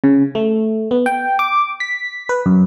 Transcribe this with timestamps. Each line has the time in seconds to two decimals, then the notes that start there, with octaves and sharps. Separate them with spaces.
0.04 C#3
0.35 A3
0.91 B3
1.06 G5
1.39 D6
1.80 B6
2.29 B4
2.46 F#2